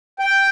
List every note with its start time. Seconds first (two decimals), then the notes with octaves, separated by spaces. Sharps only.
0.19 G5